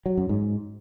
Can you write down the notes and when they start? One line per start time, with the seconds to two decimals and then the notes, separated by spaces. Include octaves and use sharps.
0.06 F#3
0.17 F#2
0.29 G#2